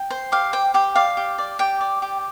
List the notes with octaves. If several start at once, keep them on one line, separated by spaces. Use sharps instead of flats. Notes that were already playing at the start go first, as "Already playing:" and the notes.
Already playing: G5
C5
G4 F5
C5 G5
G4 G5
D5 F5
G4
D5
G4 G5
D5
G4